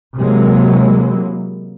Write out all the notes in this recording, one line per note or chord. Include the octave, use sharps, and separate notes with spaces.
C3 E3 F#3 G#3 A#3